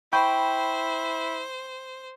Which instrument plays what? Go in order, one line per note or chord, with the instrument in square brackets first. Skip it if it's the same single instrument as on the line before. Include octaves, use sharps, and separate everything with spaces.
[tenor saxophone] E4 [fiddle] C5 [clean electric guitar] G5 [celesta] B5 C#6 G6